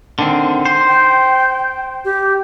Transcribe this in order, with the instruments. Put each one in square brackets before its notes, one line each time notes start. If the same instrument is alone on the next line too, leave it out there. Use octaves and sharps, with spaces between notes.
[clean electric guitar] D3 D#3 C4
C5
[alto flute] G5
G4